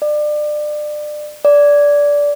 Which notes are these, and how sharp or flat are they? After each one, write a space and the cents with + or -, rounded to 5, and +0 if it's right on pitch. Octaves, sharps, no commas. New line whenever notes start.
D5 +30
D5 -15